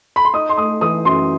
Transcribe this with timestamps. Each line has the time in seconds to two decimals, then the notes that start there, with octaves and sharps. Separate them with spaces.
0.16 B5
0.25 C6
0.33 D#4 D#6
0.49 C6
0.57 A3 D#6
0.81 E3 D#6
1.05 F#2 C6